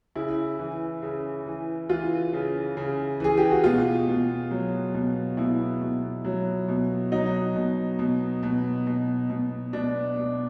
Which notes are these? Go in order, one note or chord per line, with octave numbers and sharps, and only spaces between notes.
C#3 E4
E3
C#3
E3
E3 F4
C#3
C#3
E3 G#4
G4
F#4
B2 F4
B2
F#3
B2
B2 E4
B2
F#3
B2
F#3 D#4
B2
B2
B2
B2
B2
B2 D4
B2